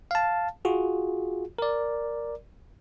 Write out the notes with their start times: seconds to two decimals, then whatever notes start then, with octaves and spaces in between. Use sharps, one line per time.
0.11 F5 A5
0.65 F4 F#4 G#4
1.59 A#4 D5